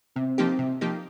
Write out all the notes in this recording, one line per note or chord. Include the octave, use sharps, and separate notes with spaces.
C3 C4
F3 A#3 D#4 G4
C3
F3 A#3 D#4 G4